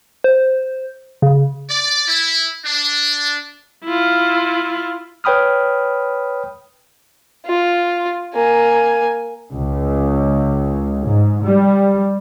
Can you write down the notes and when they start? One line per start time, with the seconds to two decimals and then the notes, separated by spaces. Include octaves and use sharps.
0.24 C5
1.22 C#3
1.70 D5
2.08 E4
2.65 D4
3.84 E4 F4
5.24 B4 C#5 G5 B5 D#6 F6
7.46 F4
8.34 A#3 G#5
9.51 C#2
11.04 G#2
11.43 G3